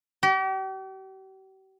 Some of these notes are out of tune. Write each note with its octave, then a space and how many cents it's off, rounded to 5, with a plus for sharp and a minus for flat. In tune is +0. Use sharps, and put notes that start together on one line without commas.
G4 -40